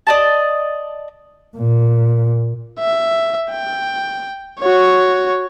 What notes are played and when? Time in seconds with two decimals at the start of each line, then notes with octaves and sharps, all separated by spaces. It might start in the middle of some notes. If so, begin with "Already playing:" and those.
0.07 D5 D#5 A5
1.57 A#2
2.79 E5
3.51 G5
4.60 F#4 C#5